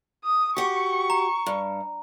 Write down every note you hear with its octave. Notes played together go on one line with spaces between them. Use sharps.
D#6
F#4 G4 C#6
A#5
G2